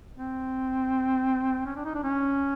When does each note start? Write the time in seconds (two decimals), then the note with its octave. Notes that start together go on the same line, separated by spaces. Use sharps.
0.17 C4
1.66 C#4
1.76 D4
1.85 D#4
1.95 D4
2.03 C#4